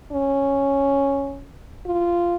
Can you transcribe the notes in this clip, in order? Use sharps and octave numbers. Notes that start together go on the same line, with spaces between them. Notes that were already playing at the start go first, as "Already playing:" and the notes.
C#4
F4